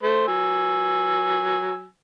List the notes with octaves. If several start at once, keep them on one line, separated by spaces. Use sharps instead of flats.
A3 C5
F#3 G#5 E6